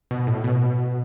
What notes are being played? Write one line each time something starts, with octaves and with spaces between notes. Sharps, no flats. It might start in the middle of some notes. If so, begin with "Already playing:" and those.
B2
A2
B2